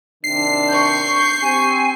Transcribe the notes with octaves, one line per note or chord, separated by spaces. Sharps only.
C3 D#3 D4 C7
C#6 G6
C4 G4 G#5